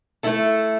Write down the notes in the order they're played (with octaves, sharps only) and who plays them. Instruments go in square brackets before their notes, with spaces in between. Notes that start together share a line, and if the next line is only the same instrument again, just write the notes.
[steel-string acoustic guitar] A3 E4 A4